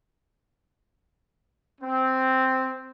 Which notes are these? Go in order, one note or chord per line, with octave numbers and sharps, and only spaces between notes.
C4